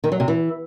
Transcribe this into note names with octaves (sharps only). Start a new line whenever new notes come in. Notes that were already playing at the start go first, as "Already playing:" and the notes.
D#3
F#3
C3
E3